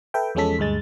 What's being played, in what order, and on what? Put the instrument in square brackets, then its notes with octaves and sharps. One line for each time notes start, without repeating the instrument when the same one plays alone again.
[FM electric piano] A4 B4 E5 G5
E2 F3 G#3 C#4 A4 B6
D2 G2 G#3 A6